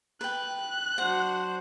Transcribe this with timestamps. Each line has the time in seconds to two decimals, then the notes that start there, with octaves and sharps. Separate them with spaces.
0.21 B4 G5 F#6
0.98 F#3 D4 F#4 C5 F#5